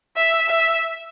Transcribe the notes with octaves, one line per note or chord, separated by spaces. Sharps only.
E5
E5